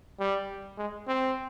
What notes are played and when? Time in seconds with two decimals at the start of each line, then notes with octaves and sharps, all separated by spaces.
0.19 G3
0.78 G#3
1.07 C4